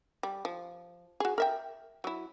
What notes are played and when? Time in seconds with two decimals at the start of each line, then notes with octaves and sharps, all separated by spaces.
0.23 G3
0.45 F3
1.20 F#4 G#4
1.38 A#4 E5 G5
2.04 F#3 E4